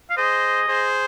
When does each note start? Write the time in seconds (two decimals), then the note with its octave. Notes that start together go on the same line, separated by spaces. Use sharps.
0.10 F5
0.17 G#4 C5 D#5
0.67 G#4 C5